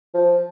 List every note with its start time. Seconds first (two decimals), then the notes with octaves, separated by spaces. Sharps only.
0.14 F3